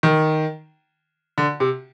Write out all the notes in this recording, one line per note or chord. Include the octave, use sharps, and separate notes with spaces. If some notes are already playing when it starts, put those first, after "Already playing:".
D#3
D3
C3